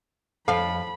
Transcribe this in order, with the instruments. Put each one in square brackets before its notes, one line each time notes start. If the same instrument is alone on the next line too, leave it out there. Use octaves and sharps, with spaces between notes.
[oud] F2 F5 [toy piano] A4 C5 A5 [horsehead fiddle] B5